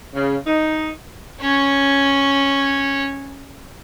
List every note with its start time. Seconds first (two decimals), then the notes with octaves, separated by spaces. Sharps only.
0.15 C#3
0.46 D#4
1.40 C#4 C#5